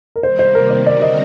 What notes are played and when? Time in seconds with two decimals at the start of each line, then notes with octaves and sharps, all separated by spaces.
0.16 A#4
0.23 C3 D#3 G3 A#3 C5
0.39 C5
0.55 A#4
0.71 C5
0.86 D3 G3 C4 F#4 A#4 D5
1.02 D#5